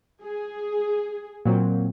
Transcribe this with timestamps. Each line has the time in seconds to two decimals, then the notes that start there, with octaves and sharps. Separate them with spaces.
0.22 G#4
1.45 A#2 F#3 C4